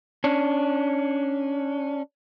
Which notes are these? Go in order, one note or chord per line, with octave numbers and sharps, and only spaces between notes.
C#4 D4